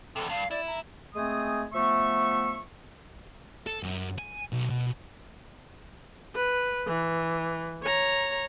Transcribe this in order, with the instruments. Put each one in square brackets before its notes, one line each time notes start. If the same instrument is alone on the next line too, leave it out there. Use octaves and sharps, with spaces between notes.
[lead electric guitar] E2 C3 [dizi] A4
[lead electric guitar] G2 [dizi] F5
[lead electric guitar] E4 [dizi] D5
[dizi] A#5
[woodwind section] G#3 A3 C4 G#5 D#6
F3 A3 B3 E5 C#6
[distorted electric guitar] A4
F#2
G#5
B1
B2
[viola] B4
E3
C#5 A#5